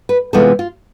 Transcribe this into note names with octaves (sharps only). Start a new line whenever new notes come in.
B4
C3 E3 G#3 B3 F4 A4
F4